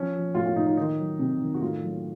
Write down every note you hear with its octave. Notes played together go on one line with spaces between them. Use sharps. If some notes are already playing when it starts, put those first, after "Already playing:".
Already playing: F3 C#4
F3
A2 F4
F4
A2 D#4
D#4
D#3 D#4
F#3
C3
D#3
F#4
A2 F4
F#3